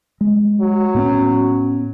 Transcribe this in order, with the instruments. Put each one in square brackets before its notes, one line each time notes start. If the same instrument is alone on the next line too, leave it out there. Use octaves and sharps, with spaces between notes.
[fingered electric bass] G#3
[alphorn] F#3
[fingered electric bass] A2 B3 C#4